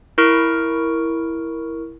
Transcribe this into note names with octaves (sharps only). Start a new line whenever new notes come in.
E4 A#4 C#6 F6 D7